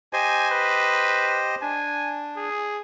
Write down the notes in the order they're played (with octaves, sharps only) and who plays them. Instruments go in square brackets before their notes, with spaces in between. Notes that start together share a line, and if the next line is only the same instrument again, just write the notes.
[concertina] G4 C5 D#5 [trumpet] G#5
[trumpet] B4
[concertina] D4 [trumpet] G#5
[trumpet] G#4